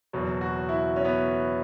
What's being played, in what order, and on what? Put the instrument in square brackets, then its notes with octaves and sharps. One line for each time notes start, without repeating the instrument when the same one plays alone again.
[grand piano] F#1 E2 B2 F#3
F#4
E4
C#4
B3